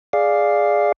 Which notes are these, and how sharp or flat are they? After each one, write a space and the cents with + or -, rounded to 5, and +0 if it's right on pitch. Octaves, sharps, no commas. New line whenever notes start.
G#4 +0 D5 +0 F5 +0